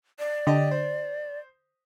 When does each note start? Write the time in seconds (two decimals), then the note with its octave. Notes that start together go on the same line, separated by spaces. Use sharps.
0.19 D5
0.47 D3 G4 D#5
0.71 C5